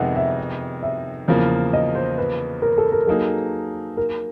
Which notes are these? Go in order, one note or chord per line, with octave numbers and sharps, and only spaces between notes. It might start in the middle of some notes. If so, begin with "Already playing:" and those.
Already playing: F2 C3 D#3 G#3 B3 F#5
E5
E5
E2 C#3 F3 A#3
D#5
C5
B4
A#4
A4
A#4
F#3 A#3 D#4 G#4 A4
A#4